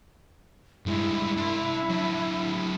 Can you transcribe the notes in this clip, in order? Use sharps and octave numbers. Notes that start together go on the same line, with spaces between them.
G2 G#3 E4
D4 C6
F#3 D4